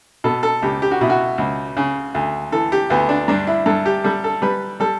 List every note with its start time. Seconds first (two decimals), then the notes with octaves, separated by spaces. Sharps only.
0.24 B2 A4
0.43 A4
0.62 C#2 G4
0.82 G4
0.91 F#4
1.01 B2 E4
1.10 F#4
1.38 C#2
1.77 C#3
2.15 D2
2.52 E3 A4
2.72 G4
2.90 D2 B3
3.09 D4
3.28 G2 D4
3.47 E4
3.66 G2 A4
3.86 G4
4.04 G3 A4
4.24 A4
4.42 G3 B4
4.80 G3 A4